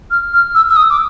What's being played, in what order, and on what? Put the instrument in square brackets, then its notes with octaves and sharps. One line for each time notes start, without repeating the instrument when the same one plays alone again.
[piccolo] F6
F6
E6
E6
D#6
D6